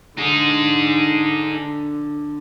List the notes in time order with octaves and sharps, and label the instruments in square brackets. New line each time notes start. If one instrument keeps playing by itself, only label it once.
[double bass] D3 D4 [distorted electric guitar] D#4 G#4